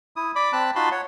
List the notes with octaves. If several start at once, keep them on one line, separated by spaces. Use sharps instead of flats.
E4 D#6
D5 B5 D6
C4 A5 B5 F#6
D#4 F4 F#4 A5 B5 C6
C#5 F#5